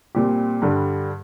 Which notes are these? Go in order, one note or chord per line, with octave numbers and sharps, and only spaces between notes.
A#2 G3 C4 G4
G2 D3 G3